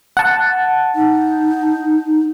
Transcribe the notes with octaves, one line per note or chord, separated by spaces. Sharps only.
F#5 A5
D#4